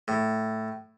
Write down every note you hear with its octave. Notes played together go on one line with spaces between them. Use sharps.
A2